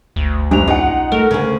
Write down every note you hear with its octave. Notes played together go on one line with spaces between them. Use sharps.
G1 D2
F#1 B1 G2 D4 F7
D#4 F4 F#5
A3 A#4
D2 C#3